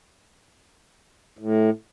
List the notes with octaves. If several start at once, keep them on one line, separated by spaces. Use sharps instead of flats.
A2